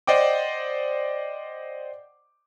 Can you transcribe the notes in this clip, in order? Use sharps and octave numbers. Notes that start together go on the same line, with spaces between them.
C5 D5 D#5 F#5 G5 D6